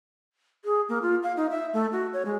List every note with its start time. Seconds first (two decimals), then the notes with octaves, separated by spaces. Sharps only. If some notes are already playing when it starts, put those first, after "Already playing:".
0.65 G#4
0.89 A#3
1.02 F4
1.23 F5
1.37 D#4
1.50 E5
1.73 A3
1.92 F#4
2.13 C#5
2.25 G#3